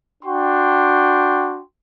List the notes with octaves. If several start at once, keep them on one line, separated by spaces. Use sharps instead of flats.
D4 F#4 G5 C6